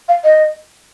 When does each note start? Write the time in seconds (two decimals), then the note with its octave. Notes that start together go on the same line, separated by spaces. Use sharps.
0.09 F5
0.24 D#5